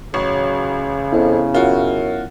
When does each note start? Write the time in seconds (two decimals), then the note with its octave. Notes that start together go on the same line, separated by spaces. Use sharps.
0.14 A1 C#3 F#3 C#6
1.13 F2 B3 E4
1.54 F#2 F4 F#4